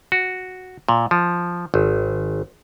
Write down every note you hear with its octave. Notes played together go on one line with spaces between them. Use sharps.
F#4
A#2
F3
G#1